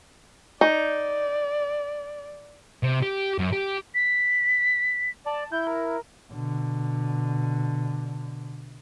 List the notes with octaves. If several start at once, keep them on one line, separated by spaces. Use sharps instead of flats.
D#4 D5
C3
G4
F#2
G4
B6
D5 A5
E4 G6
A#4
B2 D3